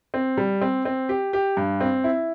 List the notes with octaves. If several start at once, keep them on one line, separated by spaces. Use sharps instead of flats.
C4
G3
C4
C4
G4
G4
G2
C4
E4